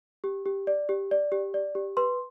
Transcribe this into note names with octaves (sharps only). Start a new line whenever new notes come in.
G4
G4
D5
G4
D5
G4
D5
G4
B4 C6